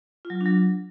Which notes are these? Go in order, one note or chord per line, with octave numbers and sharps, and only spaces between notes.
F4
F#3
F4
D4
F#3